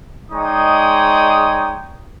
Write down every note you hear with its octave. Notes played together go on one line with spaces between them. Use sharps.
G#3 D#4 C#5 D5 G5 D#6